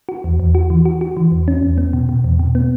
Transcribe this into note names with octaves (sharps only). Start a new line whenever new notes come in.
F#4
E2
E2
F#4
E3
F#4
F#4
E3
E2
C#4
E2
B3
B2
B2
E2
B2
B3